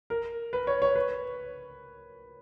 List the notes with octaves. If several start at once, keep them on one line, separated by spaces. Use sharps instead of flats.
A#4
B4
C#5
C#5
B4